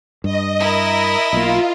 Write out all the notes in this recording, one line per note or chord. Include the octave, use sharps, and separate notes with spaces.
G2 D#5
E4 A#4
B1 A#3 F4